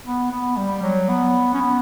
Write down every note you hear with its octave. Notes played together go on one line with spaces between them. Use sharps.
B3
B3
G3
F#3
B3
C#4
B3